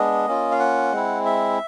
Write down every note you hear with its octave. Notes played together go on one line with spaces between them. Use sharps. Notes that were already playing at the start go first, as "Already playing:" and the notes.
Already playing: G#3 B3 D4 D#5
A#3 C#4 F4
F5
F#5
G#3 C4 E4
E5